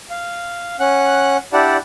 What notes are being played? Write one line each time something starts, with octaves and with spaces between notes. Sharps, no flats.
F5
C#4 F#5 F#6
D4 E4 G4 D5 F#5 A5